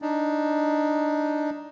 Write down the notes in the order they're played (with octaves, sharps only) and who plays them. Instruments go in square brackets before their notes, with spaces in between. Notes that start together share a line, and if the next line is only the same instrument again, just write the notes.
[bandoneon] D4 D#4